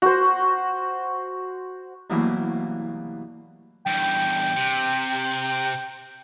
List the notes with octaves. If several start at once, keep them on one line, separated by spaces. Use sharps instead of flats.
F#4 C5
C2 B2 E3 F#3 A3 A#3
E2 G2 G5
C3